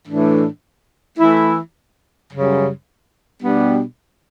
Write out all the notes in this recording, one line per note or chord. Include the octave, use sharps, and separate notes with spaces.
A2 E3 A3 D4
E3 A3 E4
F#2 C#3 G3
B2 G3 B3 D4 G4